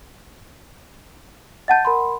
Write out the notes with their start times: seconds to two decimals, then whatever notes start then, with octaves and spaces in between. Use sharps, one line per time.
1.68 D#5 F#5 A5 G6 A6
1.85 A#4 B5 C6